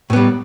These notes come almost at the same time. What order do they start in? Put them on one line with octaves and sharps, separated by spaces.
A2 B3 G3